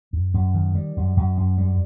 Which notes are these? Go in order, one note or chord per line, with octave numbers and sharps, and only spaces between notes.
F#2
F#2
D#3
G3
F#2
F#2
F#2
G3